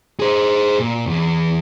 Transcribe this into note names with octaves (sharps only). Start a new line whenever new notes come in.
G#4 C5
A#2
E2